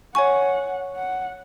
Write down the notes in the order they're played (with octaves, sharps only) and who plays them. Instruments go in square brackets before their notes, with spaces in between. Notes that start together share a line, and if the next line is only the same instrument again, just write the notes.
[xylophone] C#5 G#5 C#6 [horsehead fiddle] F#5
[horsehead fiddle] F#5